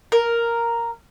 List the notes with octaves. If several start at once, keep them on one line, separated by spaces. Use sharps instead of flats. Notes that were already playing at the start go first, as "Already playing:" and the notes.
A#4